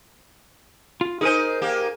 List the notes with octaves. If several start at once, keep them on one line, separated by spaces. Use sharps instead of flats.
F4
D#4 G#4 A#4 C5 G#5
A#3 G4